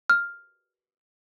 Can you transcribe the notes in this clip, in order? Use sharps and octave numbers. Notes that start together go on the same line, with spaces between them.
F6